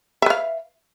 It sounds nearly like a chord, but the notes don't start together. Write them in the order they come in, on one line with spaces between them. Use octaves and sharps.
E5 B4 F5